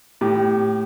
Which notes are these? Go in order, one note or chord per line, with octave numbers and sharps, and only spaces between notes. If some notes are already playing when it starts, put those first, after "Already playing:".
A2 G4